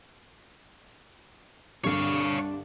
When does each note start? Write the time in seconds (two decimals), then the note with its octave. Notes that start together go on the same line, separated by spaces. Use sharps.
1.84 C2 G2 D3 D4 C#5 F5